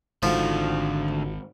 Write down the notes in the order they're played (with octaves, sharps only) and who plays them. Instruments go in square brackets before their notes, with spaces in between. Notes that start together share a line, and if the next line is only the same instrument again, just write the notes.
[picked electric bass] G#1 G#2 [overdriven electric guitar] D3 A3 [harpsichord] F3 [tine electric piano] D#4 F4 F#4